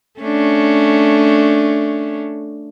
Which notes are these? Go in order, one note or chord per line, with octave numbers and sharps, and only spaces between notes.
A3 C#4 D4